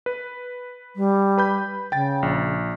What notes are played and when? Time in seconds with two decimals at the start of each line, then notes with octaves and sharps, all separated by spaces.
0.06 B4
0.96 G3
1.38 B4 B5 G6
1.92 C#3 G5 A6
2.23 A#1